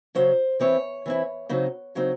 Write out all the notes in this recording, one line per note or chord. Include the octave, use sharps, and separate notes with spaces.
C#3 F#3 C#4 C5
E3 C4 E4 C#5
E3 C4 E4
C#3 F#3 C4 D#4
C#3 F#3 C4 D#4